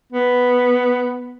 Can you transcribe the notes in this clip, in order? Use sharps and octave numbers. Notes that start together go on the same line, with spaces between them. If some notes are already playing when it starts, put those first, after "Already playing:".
B3